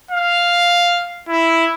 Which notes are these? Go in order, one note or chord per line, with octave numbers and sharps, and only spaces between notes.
F5
E4